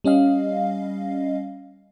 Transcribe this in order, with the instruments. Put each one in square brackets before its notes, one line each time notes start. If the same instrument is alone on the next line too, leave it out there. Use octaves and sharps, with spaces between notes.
[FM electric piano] G3 C#4 D#5 F5